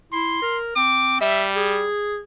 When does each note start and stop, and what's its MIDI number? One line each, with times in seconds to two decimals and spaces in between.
0.13 0.38 64
0.13 0.58 84
0.42 0.75 70
0.76 1.20 60
0.76 1.18 86
1.21 1.88 55
1.21 1.46 76
1.56 2.20 68